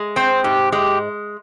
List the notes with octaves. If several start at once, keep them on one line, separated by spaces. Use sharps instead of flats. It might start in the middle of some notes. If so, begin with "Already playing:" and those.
Already playing: G#3
C4 C5
G#2 G4
G#3 G4